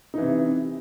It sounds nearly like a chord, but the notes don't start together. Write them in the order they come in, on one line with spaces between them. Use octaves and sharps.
D#4 E3 C3